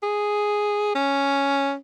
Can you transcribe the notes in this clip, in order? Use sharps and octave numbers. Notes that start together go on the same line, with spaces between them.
G#4
C#4